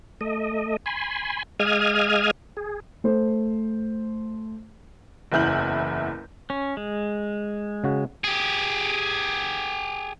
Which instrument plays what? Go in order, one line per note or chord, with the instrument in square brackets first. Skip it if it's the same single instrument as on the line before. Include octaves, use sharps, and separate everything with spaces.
[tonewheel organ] A3 D#5
G#5 B5 C6
G#3 D#5 F5 D#6 F6 G#6
G#4
[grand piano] A3 C5
[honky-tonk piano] F#1 E2 E4 G6 F#7
[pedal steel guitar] C#4
G#3
[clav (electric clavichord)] C#3 F#4
[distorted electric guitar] G4 G#4